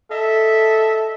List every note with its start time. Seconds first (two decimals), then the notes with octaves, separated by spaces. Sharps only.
0.11 A4 D#5 E5